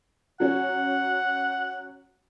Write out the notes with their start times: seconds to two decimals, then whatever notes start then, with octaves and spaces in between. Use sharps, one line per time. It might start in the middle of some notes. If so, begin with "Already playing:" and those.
0.40 F#3 C#4 F#4 F#5